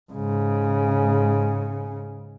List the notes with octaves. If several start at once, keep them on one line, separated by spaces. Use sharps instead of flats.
G#2 C#3